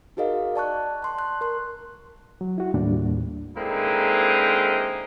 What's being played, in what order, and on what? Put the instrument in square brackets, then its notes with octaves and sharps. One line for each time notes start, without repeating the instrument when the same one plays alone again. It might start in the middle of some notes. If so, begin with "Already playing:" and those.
[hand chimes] D#4 F#4 G#4 A#4 D#5 F5
D5 A5 C#6 F#6
A5 C6 C#6
F#6
A#4 C6
[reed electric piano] F#3
E4 F#4
D#2 A2 G3 A#3 D4
[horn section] D3 G#3 A#3 C4 D#4 E4